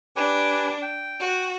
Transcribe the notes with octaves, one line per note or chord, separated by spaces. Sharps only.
D4 G4 B4 G#5
G5
F#4